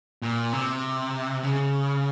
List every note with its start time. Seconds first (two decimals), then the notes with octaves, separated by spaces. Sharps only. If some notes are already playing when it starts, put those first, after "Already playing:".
0.22 A#2
0.53 C3
1.43 C#3